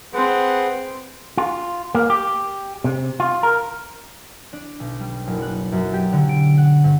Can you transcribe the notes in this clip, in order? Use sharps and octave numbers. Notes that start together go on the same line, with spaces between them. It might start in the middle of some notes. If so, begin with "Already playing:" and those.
C4 G#4 B4 F#5
F4
A#3
G4
C3
F4
A#4
D4
B1
G3
F#1
F#6
F#2
G4
D3
D7
F#5
G2